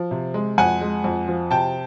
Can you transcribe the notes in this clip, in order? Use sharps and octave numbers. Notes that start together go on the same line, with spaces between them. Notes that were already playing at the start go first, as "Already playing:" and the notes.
Already playing: F3
C3
G#3
F2 F#5 G#5
G#3
F2
F3
C3 G5 A5